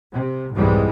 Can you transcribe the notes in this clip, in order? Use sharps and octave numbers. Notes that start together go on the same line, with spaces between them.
C3
C2 F2 G#2 E3 G3 G#3